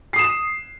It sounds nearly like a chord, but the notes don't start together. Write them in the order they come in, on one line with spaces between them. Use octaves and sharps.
C7 D#6 E7